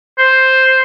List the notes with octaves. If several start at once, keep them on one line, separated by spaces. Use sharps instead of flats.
C5